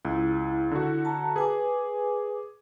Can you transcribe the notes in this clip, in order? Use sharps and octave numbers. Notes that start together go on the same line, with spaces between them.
C#2 E4
D3 F#4
A5 A#5
G#4 B4 G#5 D6